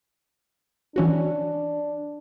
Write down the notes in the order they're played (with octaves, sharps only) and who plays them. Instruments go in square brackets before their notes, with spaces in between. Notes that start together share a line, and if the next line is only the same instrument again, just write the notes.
[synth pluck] E3 C#4 F#4 [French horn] D4